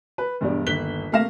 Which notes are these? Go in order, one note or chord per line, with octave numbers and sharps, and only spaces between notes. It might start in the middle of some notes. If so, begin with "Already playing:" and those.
B4
E1 G2 B3 G4 D5
G1 D#2 F#6 B6 G7
C3 A3 A#3 F5 A#6 E7